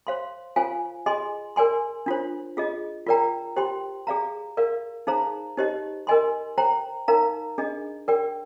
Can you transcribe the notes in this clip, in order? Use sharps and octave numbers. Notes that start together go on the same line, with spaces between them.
C5 F5 C6
F4 C5 F5 G#5
G#4 D#5 G#5 C6
A#4 D5 G#5 C6
D4 F4 C5
F4 G#4 D#5
F4 A#4 D5 G5 A#5
G4 C5 G5 C6
G#4 D5 F5 A#5
A#4 D5 F5
D#4 G#4 C5 F5 A#5
D#4 G4 C5 D#5
A#4 D#5 G#5 C6
C5 G5 A#5
D#4 A#4 F5 A#5
D4 G#4 D#5
A#4 D5 G5